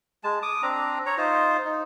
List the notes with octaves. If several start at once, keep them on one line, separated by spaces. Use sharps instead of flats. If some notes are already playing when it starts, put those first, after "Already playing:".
G#3 A5
D6 D#6
C4 D4 A#5
C#5 A#5
D#4 F4 C5
D#4